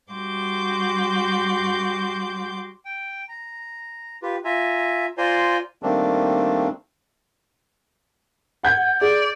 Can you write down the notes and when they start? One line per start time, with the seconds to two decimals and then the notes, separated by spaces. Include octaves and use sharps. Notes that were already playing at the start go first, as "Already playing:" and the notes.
0.11 G3 F#4 C6 D6 G6
2.85 G5
3.28 A#5
4.23 F4 G4 B4
4.44 F4 E5 G#5 A#5
5.18 F4 C5 D5 G#5 A#5 C6
5.83 D#3 G3 A3 A#3 C4 D4
8.63 F#5 G6 G#6
9.01 G#4 D5